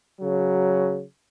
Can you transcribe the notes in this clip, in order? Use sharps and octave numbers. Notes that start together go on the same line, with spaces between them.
C#3 F#3